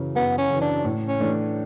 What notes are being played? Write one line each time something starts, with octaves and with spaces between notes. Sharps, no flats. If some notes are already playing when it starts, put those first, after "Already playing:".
Already playing: F#2 C#3 E3
F#2 B3
C#4
C#3 E3
D4
A2
C#4
E3 A3 D4